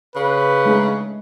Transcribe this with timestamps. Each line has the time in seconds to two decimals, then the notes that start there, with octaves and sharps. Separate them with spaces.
0.16 C#3 B4
0.65 G#3 A3 D#4